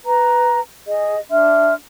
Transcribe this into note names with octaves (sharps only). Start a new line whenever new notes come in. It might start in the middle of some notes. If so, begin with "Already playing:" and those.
B4 A#5
G#4 D#5
D4 E5 C6 F6